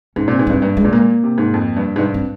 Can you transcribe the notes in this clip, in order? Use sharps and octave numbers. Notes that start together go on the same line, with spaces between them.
G#2 C#4
A#2 C4
G#2
G2 C4
G2 A#3
G#3
A#2
A#3
C3
G#2
F2
G2
G#2
G2
C4